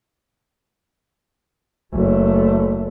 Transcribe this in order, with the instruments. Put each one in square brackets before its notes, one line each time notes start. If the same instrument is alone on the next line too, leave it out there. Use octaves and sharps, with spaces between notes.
[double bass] F#1 A3